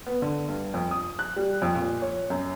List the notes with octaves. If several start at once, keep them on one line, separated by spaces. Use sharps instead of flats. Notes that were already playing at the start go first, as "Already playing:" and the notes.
B3
D3
G2
F2
D#6
F#6
G3
F2
A#2
C#5
F#2